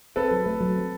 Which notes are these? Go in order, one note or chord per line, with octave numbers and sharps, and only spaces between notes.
C4 A4 B4
F#3
A3
F#3
C4